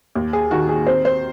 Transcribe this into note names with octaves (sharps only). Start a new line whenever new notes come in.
D#2
G#4
D#3 F#4
G#4
C4 C5
C5